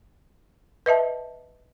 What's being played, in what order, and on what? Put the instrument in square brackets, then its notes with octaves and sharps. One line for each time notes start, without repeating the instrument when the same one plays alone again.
[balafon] B4 D#5 E5 A5